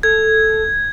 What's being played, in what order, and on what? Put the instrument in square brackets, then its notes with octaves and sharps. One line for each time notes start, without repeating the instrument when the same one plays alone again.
[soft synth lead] A4 [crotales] G#6